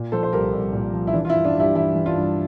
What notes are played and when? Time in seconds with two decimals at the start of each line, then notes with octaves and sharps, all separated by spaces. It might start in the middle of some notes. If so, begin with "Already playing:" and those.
Already playing: A#2
0.12 F3 A4 C5
0.23 C5
0.33 C2 G4 A#4
0.53 C2
0.73 A#2
0.93 F3
1.07 E4
1.13 E3 D4
1.25 F4
1.30 E4
1.34 G2
1.45 D4 F4
1.55 G2 E4 G4
1.75 E3 E4
1.95 E3
2.06 D4 F4
2.15 G2